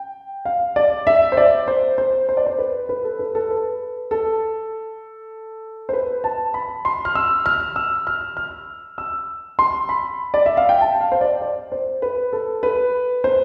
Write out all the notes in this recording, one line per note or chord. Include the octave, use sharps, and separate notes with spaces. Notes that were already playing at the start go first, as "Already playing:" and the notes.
Already playing: G5
F5
D5
E5
C5
D5
C5
C5
C5
D5
C5
B4
B4
A4
B4
A4
B4
A4
C5
B4
A5
B5
C6
F6
E6
F6
E6
F6
F6
E6
C6
B5
D5
E5
F5
G5
A5
F5
C5
D5
D5
C5
B4
A4
B4
C5